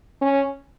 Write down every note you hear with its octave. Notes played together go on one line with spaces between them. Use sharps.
C#4